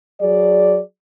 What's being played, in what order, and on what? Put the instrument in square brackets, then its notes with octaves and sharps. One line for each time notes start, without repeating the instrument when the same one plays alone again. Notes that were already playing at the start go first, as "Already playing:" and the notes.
[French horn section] F#3 G#4 D5